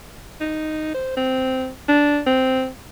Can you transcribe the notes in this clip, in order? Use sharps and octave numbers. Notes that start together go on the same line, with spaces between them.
D#4
C5
C4
D4
C4